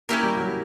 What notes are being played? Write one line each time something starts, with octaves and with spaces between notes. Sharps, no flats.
A#3 C#4 E4 G4 A#4
G3
F#3